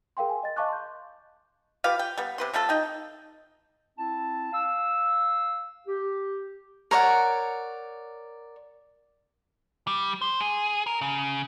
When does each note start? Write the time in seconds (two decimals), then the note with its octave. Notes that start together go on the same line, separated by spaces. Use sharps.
0.17 G#4 A#4 F5 G5 C6
0.29 G#5
0.43 D#5 A6
0.56 D#5 F5 A5 C#6 D6 F#6
0.68 C6 G6
1.84 F4 G4 B4 F5
1.99 G5
2.18 G3 B3
2.38 C3 B4 C6
2.54 C3 G3 F4 A4
2.69 D#4 G5
3.98 C4 E4 A5
4.53 F5 E6
5.87 G4
6.91 A#4 C#5 D5 F#5
9.87 G3
10.22 C5
10.41 G#4
10.87 A#4
11.01 C#3